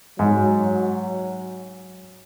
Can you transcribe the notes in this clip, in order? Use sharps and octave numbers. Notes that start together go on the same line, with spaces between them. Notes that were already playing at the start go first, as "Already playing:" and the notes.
G#2 F#3